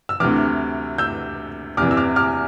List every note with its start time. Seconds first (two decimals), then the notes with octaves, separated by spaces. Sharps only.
0.09 E6
0.20 D2 C3 E3 D6 F6
0.98 E6 G6
1.77 E2 C3 E3 D6 F6
1.91 E6
1.97 D6 F6
2.16 D6 F6